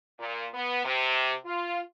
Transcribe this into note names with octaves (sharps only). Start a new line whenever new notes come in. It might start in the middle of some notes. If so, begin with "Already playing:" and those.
A#2
B3
C3
F4